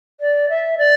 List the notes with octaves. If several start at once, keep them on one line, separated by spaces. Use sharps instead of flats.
D5
E5
D5